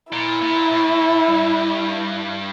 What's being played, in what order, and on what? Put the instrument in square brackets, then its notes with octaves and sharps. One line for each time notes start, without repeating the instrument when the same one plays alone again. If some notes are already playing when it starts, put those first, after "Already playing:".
[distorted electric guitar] A#2 [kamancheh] E4
[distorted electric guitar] A#2
A2
G2